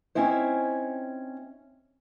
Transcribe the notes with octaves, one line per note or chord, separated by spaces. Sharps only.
C4 C#4 D#4 E4 C5